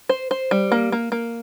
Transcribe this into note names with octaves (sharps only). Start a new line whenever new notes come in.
C5
C5
G3
A#3
A#3
A#3